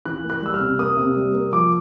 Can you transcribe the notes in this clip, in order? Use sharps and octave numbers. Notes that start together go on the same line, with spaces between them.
E3 F#6
A#3
F#6
G3 E6
F6
C3
A#3 D#6
C3
G3
A#3
F3 D6